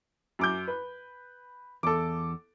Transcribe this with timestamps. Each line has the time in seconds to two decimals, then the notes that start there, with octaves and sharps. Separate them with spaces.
0.39 F#2 D6 G6
0.68 B4
1.83 E2 A4 D6